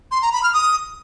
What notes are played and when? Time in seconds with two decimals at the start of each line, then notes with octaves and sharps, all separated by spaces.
0.11 C6
0.22 A#5
0.33 B5
0.43 F6
0.54 D#6